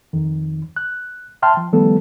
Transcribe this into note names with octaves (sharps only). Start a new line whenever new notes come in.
F2 D#3
F#6
E5 G5 A5 C6 F6
F3
D#3 F3 G3 A3 B3 A4